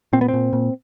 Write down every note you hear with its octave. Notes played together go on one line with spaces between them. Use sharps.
A#2 C4
B3
A#2 C4
A#2